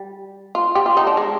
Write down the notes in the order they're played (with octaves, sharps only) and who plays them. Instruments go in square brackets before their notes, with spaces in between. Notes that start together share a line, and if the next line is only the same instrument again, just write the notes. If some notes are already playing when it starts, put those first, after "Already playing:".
Already playing: [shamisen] G3
F4
G4
F4
D#4
D4
G#3